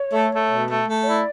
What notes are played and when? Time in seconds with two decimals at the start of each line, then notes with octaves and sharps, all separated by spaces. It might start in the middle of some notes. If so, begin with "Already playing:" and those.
Already playing: C#5
0.13 A3
0.31 A3
0.50 B2
0.69 A3
0.88 A3
1.02 C#5
1.07 E4 D5